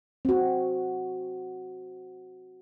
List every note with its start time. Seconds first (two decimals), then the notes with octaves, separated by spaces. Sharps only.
0.25 C4 F#4